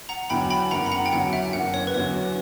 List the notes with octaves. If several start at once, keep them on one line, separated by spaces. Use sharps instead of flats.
F#5 A#5
E2 D3 F#3 G5 B5
G5 B5
F#1 F#5 A#5
B5
F#5 A#5
G5
E2 D3 F#3 F#5
E5
F#1 F#5
C#5
B4
E2 D3 F#3 C#5